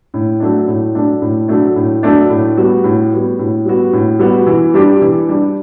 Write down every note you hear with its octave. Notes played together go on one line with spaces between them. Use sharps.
A2
F#3 A3 D4
A2
F#3 A3 D4
A2
F#3 A3 D4
A2
F#3 A3 D4
A2
G3 B3 F#4
A2
G3 B3 F#4
A2
G3 B3 F#4
A2
G3 B3 F#4
E3
G3 D4 G4
E3
G3 D4 G4